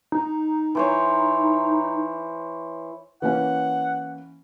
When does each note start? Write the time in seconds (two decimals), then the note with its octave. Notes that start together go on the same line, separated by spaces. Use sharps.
0.12 D#4
0.75 E3 C5 C#5
3.22 E3 A#3 C#4 F#5